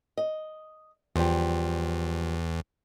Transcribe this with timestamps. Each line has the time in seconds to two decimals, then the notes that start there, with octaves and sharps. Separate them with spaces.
0.17 D#5
1.16 E2 F3 G3